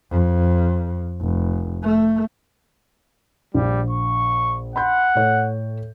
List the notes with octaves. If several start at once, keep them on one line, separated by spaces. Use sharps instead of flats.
F2
F1
A3
A#1 G3
C#6
F#5 B5 C6 G6
A2 C#5